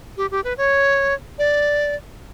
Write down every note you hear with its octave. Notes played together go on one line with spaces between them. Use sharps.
G4
G4
B4
C#5
D5